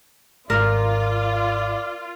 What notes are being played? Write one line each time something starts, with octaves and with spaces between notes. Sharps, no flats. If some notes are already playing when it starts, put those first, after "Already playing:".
G#1 F4 A#4 D5